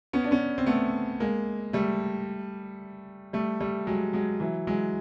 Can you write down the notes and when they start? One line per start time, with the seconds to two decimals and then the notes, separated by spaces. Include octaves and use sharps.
0.13 B3 C#4
0.24 D4
0.31 B3 C#4
0.58 C4
0.67 A3 B3
1.20 G#3 A#3
1.73 G3 A3
3.33 G3 A3
3.60 G3 A3
3.87 F#3 G#3
4.13 F#3 G#3
4.40 E3 F#3
4.67 F#3 G#3